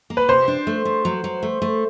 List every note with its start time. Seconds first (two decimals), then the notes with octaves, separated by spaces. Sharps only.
0.10 A#3
0.17 B4
0.29 C3 C5
0.48 D4
0.67 A3
0.85 A3
1.05 F#3
1.24 F#3
1.43 A3
1.62 A3